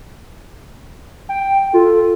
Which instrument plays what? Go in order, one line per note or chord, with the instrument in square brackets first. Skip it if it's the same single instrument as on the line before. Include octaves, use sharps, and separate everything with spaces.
[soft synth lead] G5
[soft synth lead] F4 [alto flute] A4